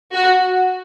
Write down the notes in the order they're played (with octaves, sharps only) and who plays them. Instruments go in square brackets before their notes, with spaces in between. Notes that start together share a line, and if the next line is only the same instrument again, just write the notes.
[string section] F#4